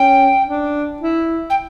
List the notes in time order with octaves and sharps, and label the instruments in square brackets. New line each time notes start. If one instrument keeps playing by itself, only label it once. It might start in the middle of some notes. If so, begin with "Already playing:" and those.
Already playing: [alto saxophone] C#4 [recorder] G5
[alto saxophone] D4
E4
[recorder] G5